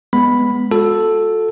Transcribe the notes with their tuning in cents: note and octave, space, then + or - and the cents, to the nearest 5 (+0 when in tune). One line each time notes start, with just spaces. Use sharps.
G#3 +0 B3 +0 B5 +0
F#4 -35 A4 +0